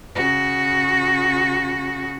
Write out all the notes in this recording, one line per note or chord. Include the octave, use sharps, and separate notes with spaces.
C#3 F#4